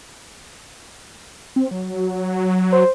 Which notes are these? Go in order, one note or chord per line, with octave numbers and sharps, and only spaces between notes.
C4
F#3
C5